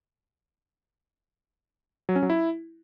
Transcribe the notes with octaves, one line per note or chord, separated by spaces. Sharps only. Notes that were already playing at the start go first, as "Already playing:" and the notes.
F#3
C#4
F#3
E4